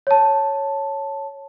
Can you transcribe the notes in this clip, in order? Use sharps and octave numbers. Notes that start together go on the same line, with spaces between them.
C#5 A5